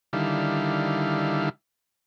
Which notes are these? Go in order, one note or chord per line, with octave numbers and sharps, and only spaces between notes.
D3 D#3 G3 E4 F5